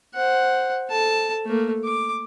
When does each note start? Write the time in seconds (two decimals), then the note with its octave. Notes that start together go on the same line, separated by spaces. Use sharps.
0.15 C5 F#5
0.89 A4 A5
1.45 A3 A#3
1.84 D6